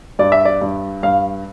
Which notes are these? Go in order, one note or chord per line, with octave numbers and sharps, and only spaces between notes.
G2 D5
E5
D5
G2
G2 F5